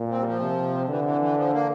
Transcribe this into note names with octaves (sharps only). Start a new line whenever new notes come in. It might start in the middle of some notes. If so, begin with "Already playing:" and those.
Already playing: A#2
C4
G3
F3
C3
D3 E3
E3
E3
F3
A#3